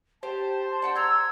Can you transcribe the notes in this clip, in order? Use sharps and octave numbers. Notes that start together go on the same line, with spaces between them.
G4 C5 A5
D4 F#5 G5
A#5 C6 E6 G#6